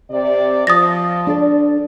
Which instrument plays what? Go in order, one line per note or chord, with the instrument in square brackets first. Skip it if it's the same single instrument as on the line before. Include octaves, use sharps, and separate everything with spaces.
[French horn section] C3 D5
[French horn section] F3 [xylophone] D#6 A6 A#6
[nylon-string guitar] D4 A4 D5